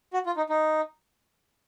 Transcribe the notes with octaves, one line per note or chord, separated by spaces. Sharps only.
F#4
F4
D#4
D#4